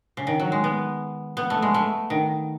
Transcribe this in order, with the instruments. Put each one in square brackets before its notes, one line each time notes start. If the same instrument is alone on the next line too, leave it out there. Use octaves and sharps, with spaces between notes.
[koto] C#3
D#3
F#3
G#3
B3
B3
A3
G#3
A3
D#3